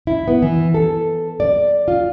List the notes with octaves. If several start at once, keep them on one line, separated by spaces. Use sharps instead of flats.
E4
B3
E3
A4
D5
F4